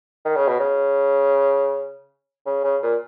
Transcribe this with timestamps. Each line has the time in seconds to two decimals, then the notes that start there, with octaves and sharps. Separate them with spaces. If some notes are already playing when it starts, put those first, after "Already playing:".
0.25 D#3
0.36 C#3
0.48 B2
0.59 C#3
2.46 C#3
2.64 C#3
2.82 A#2